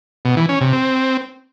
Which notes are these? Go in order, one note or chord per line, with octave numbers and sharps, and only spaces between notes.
B2
E3
C#4
C3
C4